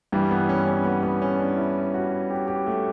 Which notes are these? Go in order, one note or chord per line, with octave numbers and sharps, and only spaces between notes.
G2 E3 G3
B3
C#4
C#4
B3
B3
C#4
D4
E4
F#4
G4
G4
A3